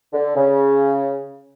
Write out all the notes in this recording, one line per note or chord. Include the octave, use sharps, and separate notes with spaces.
D3
C#3